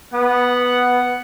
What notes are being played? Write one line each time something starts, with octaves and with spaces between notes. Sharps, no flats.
B3 F#5